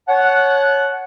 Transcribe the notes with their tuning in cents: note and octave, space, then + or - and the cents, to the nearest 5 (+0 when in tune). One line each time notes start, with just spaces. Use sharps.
C#5 +0 F#5 +0 A5 -30